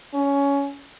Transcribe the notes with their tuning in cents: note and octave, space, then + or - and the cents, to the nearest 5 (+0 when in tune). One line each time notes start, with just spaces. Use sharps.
C#4 +15